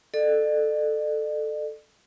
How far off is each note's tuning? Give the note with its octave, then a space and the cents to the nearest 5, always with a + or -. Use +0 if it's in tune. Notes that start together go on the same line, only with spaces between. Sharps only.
A4 +0 D5 +40